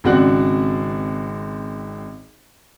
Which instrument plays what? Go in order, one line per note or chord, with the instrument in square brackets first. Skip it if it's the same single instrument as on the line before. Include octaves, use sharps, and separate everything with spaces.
[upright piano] G#1 C#3 C4 F#4 D5 F#6